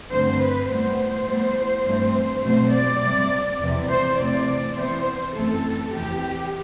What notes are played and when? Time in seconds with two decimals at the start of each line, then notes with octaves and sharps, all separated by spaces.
0.10 G2 D3 A3 C4 C5
0.40 B4
0.69 A2 G3 B3 C5
1.27 A2 G3 B3
1.85 G2 E3 A3 C4
2.43 B2 F#3 A3 C4 C5
2.72 D5
3.02 C3 G3 C4
3.60 E2 C3 E3
3.89 C5
4.18 C3 E3 A3 C4 D5
4.76 C3 E3 B3 C5
5.34 F#2 E3 A3 C4 A4
5.92 E2 C3 E3 G4